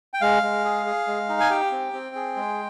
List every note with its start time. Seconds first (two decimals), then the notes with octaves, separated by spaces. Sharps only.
0.14 G5
0.21 G#3 F5
0.43 G#3
0.65 G#4
0.86 G#4
1.07 G#3
1.29 D#4
1.40 G#5
1.51 G4 G5
1.71 C4
1.93 C4
2.16 G#4
2.36 G#3